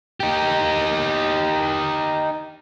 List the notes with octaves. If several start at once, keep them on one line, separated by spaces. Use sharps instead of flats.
D#4 G4